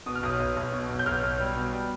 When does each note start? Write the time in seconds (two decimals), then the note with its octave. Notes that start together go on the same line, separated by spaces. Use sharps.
0.06 B2 D#6
0.16 F6
0.23 B1 D#6
0.40 B1
0.57 B1
0.73 B2
0.90 B1
0.99 G6
1.06 B1 F6
1.23 B1
1.40 G3
1.57 B2
1.73 G3